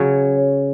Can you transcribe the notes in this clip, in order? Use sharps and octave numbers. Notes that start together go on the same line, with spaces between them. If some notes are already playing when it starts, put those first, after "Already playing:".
Already playing: C#3 F#3 C#5